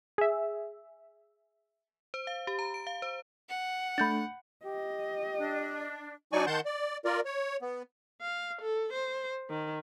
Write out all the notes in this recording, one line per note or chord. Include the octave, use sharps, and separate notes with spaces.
G#4 E5
C5
F5
G4
A#5
D7
F5
C5
F#5
A3 D4 B5 G6 A6
G4 D#5
D4
F#3 D4 D#4 D5 G#5 C#6
D#3 F#5 A5 C6 G6
D5
F4 A#4 D5
C#5
B3
F5
A4
C5
D#3